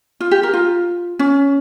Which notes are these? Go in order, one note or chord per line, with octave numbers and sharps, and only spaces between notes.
F4
G4
A#4
F4
C#4